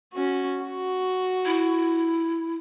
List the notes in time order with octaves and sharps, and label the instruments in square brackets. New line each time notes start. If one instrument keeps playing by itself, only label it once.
[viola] C#4 F#4
F#4
[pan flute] E4